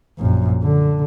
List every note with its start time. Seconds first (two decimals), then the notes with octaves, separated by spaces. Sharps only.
0.19 A#1 F#2
0.63 D3